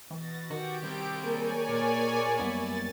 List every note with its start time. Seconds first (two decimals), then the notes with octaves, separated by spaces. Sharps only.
0.11 B2 E3 A6 A#6
0.50 D#3 F#4 G4 D7
0.83 G3 C4
1.24 A#3 G#4 A#4 C#5 D5 G#5
1.69 A#2
2.39 F#2 G3 A#3 B3 E4 A6